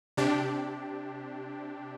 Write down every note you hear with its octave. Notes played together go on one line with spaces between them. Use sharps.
C3 D4 G4